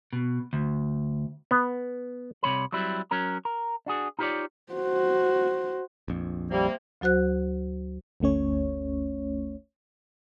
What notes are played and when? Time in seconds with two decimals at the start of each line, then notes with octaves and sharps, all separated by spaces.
0.13 B2
0.53 D2
1.51 B3
2.43 C2 C3 A3 C#5 B5
2.72 F#3 G3 C4 E4
3.11 F#3 C#4 A#4
3.45 A#4
3.86 D4 F#4 G#4
4.19 D#4 F4 G4 B4 C#5 D5
4.73 F#4 C5
6.08 A#1 F2
6.51 C3 G3 A#3
7.01 D2 F#3 F#4 C5 F#6
8.20 G1 D2 A3 C#4 C#5